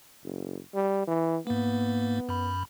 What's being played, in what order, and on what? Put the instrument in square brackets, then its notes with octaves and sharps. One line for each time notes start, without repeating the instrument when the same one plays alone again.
[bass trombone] F#1
G3
E3
[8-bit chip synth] G#2 A#3 [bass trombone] B3
[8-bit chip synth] F#2 B5